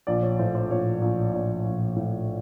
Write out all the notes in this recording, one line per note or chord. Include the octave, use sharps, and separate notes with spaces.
A#1 D5
C#5
A2 C5
C5
A#1 C#5
A#1
A#1 D5
A#1
A2